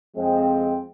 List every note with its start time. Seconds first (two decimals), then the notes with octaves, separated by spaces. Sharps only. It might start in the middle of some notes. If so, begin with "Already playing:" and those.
0.16 F2 F3 G#3 C4